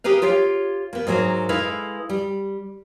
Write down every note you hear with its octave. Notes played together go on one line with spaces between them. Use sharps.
G4 G#4 A#4 B4 F5
F4 G4 C#5 F5
A#3 B3
G#2 E3 F#3 G#4 A#4
G#3 E4 A4 B4 F5
G3